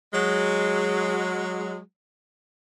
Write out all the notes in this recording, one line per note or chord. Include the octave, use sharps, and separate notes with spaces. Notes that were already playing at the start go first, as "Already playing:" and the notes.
F#3 G#3